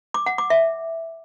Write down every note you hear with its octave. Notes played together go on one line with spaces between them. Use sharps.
D6
F#5
D6
E5